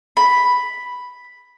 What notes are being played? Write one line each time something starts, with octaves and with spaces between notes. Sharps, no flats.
B5